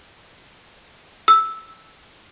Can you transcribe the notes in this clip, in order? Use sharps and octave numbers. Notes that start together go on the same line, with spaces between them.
E6